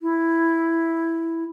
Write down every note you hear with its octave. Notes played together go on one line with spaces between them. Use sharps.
E4